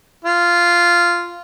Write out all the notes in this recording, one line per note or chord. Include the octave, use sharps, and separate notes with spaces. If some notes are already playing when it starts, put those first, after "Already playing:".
F4